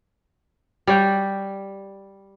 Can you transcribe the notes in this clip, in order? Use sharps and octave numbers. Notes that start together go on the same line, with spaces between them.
G3 C#5 G5